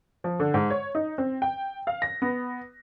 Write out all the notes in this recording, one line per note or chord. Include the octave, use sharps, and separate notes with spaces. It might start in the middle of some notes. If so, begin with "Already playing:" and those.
F3
D3
G#2
C#5
D#4
C4
G5
F5
A#6
B3